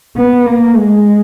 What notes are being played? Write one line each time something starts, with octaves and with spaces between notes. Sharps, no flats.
B3
A#3
G#3